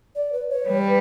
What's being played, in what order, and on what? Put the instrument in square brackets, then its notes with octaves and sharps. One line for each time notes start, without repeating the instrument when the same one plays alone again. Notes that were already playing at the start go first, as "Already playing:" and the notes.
[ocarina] D5
B4
C#5
[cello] G3 [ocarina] B4